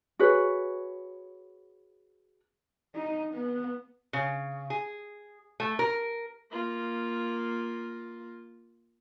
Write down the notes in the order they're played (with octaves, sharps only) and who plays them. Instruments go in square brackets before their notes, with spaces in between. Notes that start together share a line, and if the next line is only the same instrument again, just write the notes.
[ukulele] F#4 G#4 B4 C#5
[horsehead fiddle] D#4
B3
[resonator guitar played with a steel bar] C#3
G#4
A3
A#4
[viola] A#3 F4